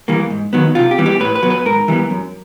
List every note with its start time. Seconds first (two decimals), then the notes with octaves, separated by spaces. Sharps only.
0.08 E3 G3 A#3
0.30 G#2
0.53 D#3 F#3 B3
0.75 C3 F4
0.91 G4
0.98 E3 G3 B3
1.06 G4
1.20 A2 B4
1.35 B4
1.43 F#3 B3
1.50 B4
1.65 G#2 A#4
1.88 E3 G3 B3
2.10 F#2